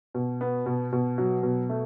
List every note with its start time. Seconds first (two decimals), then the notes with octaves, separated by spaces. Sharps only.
0.14 B2
0.41 B3
0.66 B2
0.93 B2
1.18 F#3
1.43 B2
1.69 A3